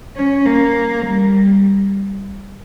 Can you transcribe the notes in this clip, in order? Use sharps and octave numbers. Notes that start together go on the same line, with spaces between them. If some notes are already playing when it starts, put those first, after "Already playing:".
C#4
A#3
G3